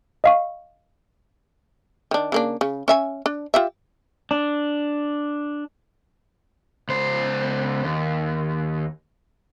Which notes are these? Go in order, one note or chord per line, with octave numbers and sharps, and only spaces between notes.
D#5 F5 C#6
D#3 D4
C#3 A#3 D4
C#3
C#4 E5 G#5
D4
F4 G4 E5
D4
C#2 C5
D#2